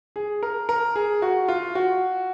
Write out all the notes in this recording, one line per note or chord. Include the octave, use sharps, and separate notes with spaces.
G#4
A#4
A#4
G#4
F#4
F4
F#4